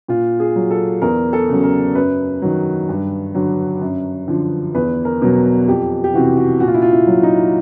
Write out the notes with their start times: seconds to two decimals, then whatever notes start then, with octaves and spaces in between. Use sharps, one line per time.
0.08 A#2 F4
0.40 G#4
0.56 F#3
0.71 A4
1.02 E2 A#4
1.33 A4
1.49 C#3 F#3
1.64 A#4
1.95 F#2 B4
2.42 D#3 F#3
2.89 G2
3.35 D3 F#3
3.81 F#2
4.28 D3 F3
4.74 E2 B4
5.05 A#4
5.22 B2 F#3
5.68 F2 G4
6.04 G4
6.14 C3 E3 F#4
6.37 F#4
6.60 A#2 F#4
6.67 F4
6.74 E4
6.82 F4
6.92 E4
7.07 F#3
7.23 D#4